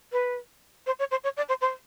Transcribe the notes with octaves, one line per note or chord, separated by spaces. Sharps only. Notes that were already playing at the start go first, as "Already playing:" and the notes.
B4
C5
C#5
C5
C#5
D5
C5
C5